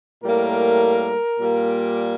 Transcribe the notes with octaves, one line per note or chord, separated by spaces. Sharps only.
A2 G3 A#3 A#4
A#2 G3 A#3